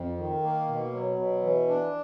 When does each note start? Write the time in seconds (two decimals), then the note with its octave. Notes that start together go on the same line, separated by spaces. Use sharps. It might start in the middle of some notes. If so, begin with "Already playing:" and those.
Already playing: F2
0.18 D#3
0.43 A#3
0.68 B2
0.93 F#3
1.18 B2
1.43 E3
1.68 D4